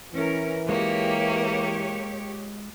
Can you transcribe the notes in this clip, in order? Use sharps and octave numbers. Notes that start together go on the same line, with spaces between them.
E3 C#4 A#4
G#3 A#3 F4 G4 C#5